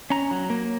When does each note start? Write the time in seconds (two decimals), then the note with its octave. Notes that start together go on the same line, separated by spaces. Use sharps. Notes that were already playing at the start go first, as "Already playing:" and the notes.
0.10 C#4 A#5
0.31 F#3
0.50 A#3